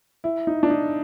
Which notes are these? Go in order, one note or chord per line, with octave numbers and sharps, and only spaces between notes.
E4
D#4
D4
D#4